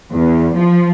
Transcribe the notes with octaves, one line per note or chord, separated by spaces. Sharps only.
E2
F3